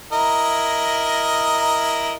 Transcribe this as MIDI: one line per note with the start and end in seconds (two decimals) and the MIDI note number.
0.12 2.16 64
0.12 2.16 70
0.12 2.16 75